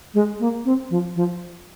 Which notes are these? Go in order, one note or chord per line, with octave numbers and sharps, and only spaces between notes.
G#3
A#3
C4
F3
F3